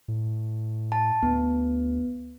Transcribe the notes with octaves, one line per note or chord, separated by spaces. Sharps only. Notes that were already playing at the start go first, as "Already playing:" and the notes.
A2
A5
D2 B3